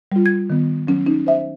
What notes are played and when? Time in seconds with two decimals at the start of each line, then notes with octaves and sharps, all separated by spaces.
0.12 G3 F4
0.26 G#6
0.50 D#3 B3
0.87 F#3 C#4
1.07 C#4 D#4
1.27 C5 E5